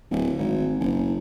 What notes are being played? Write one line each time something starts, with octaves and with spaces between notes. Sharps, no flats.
D1
G#1
F#1